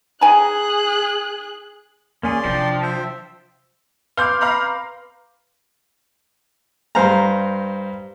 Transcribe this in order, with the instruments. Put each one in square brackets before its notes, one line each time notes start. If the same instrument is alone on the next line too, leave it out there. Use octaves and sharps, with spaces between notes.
[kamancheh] G#4 F#6 [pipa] G#5 A#5
[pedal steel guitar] A#3 C#4 G#4 [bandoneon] D5 C6
[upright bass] C3 [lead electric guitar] F3 [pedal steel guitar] D4 G5
[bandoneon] C5 G5 [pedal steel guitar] E5
[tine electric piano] B4 C6 D6 [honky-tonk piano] F5 G6
[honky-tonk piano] F5 A#5 B5
[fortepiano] G2 C5 F5 A#5